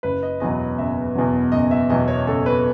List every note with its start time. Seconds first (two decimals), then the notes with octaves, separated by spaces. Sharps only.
0.03 F#1 B4
0.23 D#5
0.40 E2 B2 F#3 D#5
0.78 F#1 E5
1.15 E2 B2 F#3
1.52 F#1 D#5
1.71 E5
1.90 E2 B2 F#3 D#5
2.08 C#5
2.27 F#1 A4
2.46 B4